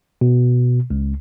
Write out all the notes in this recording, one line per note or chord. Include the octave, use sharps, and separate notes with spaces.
B2
C#2